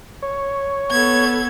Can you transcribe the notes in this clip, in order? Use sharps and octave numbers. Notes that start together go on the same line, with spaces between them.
C#5
B3 A4 G#6